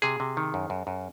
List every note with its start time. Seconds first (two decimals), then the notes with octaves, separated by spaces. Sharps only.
0.02 C3 G#4
0.20 C3
0.37 D#3
0.54 F#2
0.70 F#2
0.87 F#2